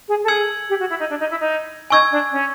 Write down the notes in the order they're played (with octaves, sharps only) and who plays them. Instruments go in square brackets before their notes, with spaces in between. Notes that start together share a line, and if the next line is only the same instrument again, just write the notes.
[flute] G#4
A4
[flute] G#4 [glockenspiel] E6 G#6 C#7 F#7
[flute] G4
F#4
E4
D#4
D4
D#4
E4
D#4
[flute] D#4 [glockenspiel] G#5 C#6 E6 G#6
[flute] D4
C#4